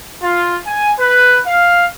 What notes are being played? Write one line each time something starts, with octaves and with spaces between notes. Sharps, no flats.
F4
G#5
B4
F5